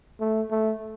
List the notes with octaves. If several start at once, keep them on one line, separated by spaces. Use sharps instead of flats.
A3
A3